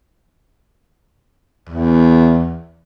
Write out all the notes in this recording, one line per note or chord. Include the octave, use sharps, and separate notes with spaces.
E2